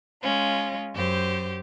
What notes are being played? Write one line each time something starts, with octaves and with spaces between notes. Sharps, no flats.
G#3 C#4 F4
F#2 G4 C5